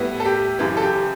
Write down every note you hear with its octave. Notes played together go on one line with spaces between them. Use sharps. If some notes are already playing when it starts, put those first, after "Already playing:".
Already playing: A2 G3 B3 E4
A4
G4
F#2 C#3 E3 G4
A4
G4